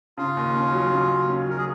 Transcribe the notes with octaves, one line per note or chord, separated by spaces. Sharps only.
C#3 F4
D#2
C#4
F#3
C#3
D#2
C#4
F#3 A#4
G#4